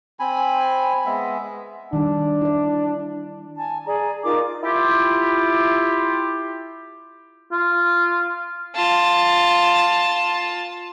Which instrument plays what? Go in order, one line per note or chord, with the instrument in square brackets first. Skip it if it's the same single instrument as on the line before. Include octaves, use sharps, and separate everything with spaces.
[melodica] C4 G#5 B5
G#3 B3 E5
[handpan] D#3 G3 [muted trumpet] D4
[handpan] E4 D5
[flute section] G#5 A5
G#4 D5 A#5
D#4 F4 A#4 D6
[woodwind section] E4 F4 G4
[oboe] F4
[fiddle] F4 A5